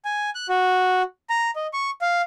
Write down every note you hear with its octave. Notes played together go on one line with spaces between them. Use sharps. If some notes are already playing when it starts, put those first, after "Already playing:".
G#5
F#6
F#4
A#5
D#5
C#6
F5